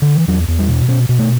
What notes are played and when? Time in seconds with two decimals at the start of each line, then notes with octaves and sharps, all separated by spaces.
0.02 D3
0.15 E3
0.28 E2 F#3
0.48 E2
0.59 G3
0.68 B2
0.88 B2 C#4
1.09 B2
1.19 A3